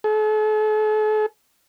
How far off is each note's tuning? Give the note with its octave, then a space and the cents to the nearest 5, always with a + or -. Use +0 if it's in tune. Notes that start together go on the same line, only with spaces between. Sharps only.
A4 -45